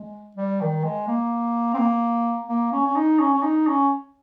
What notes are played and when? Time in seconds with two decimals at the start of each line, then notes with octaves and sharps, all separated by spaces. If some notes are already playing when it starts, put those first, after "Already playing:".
Already playing: G#3
0.36 G3
0.61 D#3
0.84 G#3
1.07 A#3
1.74 C4
1.78 A#3
2.49 A#3
2.72 C#4
2.87 C#4
2.96 D#4
3.20 C#4
3.34 C#4
3.43 D#4
3.67 C#4